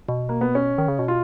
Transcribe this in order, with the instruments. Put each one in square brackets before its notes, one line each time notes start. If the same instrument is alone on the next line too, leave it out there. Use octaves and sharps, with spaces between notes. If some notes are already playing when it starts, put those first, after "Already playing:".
[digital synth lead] B2
[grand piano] A#3
B3
C#4
[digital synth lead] D#3
C#3
B2
[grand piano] F4